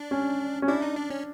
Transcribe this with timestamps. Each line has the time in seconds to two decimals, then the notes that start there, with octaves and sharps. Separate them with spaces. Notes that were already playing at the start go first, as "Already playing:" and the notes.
Already playing: D4
0.11 C#4
0.62 C#4
0.68 D4 E4
0.82 D#4
0.96 D4
1.10 C#4